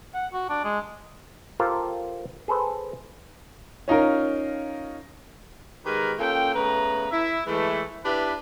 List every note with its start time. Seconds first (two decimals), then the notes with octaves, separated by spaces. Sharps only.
0.14 F#5
0.33 F#4
0.49 D4
0.64 G#3
1.60 F4 G4 A4 A#4 C5 F5
2.48 G#4 A4 B4 C5
3.88 C#4 D#4 F4 A#4
5.85 D#3 G#3 G4 G#4 A#4 B4
6.19 A#3 C#4 F4 A4 G5
6.54 C#3 A3 B3 B4 A#5
7.11 E4 E5
7.46 E3 G#3 A3
8.04 D4 E4 G4 B4